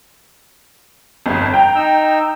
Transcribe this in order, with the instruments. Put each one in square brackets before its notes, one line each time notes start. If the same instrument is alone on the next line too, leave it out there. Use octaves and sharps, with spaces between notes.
[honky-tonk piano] G1 F2
G5 A#5
[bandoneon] D#4 E6